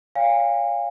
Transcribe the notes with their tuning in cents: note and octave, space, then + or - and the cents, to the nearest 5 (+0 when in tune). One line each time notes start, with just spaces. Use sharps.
C#5 +25 F5 +0 G#5 -40